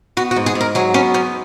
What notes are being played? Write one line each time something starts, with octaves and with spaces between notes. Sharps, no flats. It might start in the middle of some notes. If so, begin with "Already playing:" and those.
B3 F#4
F#4
G#2
G#4
G#2
A#4
F#3 G#4
B3 C#4
G#2 C#4